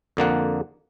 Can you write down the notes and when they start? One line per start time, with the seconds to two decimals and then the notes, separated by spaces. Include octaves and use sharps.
0.17 F2 D3 A#3 F#5